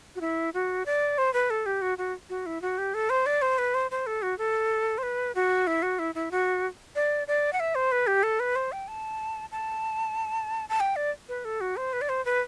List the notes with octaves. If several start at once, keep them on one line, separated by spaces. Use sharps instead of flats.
F#4
E4
F#4
D5
C5
B4
A4
G4
F#4
F#4
F#4
E4
F#4
G4
A4
C5
D5
C5
B4
C5
C5
A4
F#4
A4
C5
B4
F#4
E4
F#4
E4
E4
F#4
D5
D5
F#5
E5
C5
B4
G4
A4
B4
C5
G5
A5
A5
A5
G5
D5
B4
A4
F#4
C5
B4
D5
C5
B4